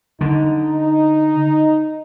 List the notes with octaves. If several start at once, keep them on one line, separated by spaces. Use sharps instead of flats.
D3 D#4